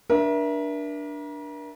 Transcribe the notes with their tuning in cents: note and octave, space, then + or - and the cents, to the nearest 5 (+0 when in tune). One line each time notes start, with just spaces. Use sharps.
D4 +0 A#4 +40 E5 +0